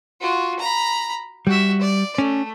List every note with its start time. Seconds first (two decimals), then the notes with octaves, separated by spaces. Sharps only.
0.21 F4 F#4
0.59 A#5 B5
1.47 G3 F#4 E5
1.81 D5
2.18 A3 C#4